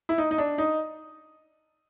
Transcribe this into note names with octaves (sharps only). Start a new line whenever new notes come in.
E4
D#4
D#4
D4
D#4